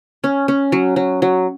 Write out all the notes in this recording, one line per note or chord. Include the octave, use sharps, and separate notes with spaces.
C#4
C#4
F#3
F#3
F#3